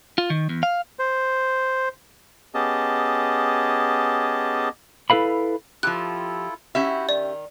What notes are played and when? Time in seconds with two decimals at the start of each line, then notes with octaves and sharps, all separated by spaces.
0.18 F4
0.30 D#3
0.49 E2
0.63 F5
0.99 C5
2.54 B3 C#4 G4 G#4 D#5 A5
5.10 E4 A4 B4 F5 B5
5.83 F3 E4 F4 G4 A4 F#6
6.75 C#4 E4 F#4 G4 E5 F#5
7.09 D#3 D5